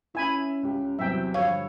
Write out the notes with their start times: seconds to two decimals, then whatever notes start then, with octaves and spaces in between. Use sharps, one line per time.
0.15 C#4 E4 E5 G#5 B5
0.63 C#2 G4
0.99 E2 C3 F#3 E5 G5
1.34 G2 D3 F3 C#5 F5 E6